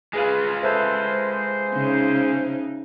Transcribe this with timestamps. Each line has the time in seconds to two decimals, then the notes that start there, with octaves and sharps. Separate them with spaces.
0.13 G#3 F4 G#4 B4 F5
0.63 A4 B4 C5 E5
1.74 C#3 D#4